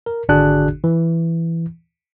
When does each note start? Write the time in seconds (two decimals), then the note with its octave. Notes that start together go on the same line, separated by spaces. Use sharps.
0.06 A#4
0.29 G#1 D3 D4 F#4 G#4 F#6
0.84 E3